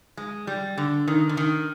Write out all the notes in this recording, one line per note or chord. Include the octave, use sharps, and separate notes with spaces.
G#3
G3
D3
D#3
D3
D#3